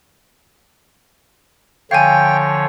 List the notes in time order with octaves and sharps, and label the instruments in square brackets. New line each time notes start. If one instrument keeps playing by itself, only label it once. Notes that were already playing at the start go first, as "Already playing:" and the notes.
[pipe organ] D3 F3 C#5 [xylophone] F5 G#5 [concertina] G5